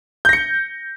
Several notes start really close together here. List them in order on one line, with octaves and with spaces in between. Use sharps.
G6 A#6 C#7